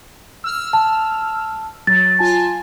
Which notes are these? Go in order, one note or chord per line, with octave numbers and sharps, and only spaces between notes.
E6 F6
A5
F#3 A6
F4 G#5 A5